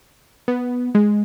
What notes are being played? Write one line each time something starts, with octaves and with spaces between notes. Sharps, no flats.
B3
G#3